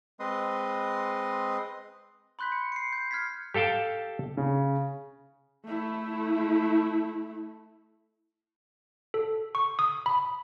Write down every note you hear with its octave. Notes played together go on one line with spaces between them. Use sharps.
G#3 C4 B4 D#5 C6 D#6
B5 C6 F#6 G6 B6
C#7
C7 C#7
G6
F6 G#6 B6
G4 A4 F5 G5 A5
C#3
A3 E4
A4
C#6
D#6
B5